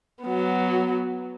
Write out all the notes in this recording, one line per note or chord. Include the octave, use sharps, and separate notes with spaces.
F#3 B3